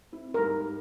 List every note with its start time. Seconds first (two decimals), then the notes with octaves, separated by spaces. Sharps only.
0.12 C4 E4
0.34 G#2 G3 A#4